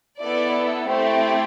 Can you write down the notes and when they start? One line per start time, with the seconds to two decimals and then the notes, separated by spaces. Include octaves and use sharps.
0.20 B3 E4 A4 D5
0.87 A3 C4 E4 G4